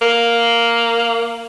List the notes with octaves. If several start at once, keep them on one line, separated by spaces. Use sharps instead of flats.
A#3